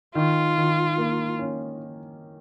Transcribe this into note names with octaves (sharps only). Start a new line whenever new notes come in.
D#3 F4
D#3
A#3
C#4